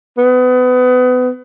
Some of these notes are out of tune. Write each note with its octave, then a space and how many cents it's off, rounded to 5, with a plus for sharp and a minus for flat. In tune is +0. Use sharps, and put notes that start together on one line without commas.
B3 +30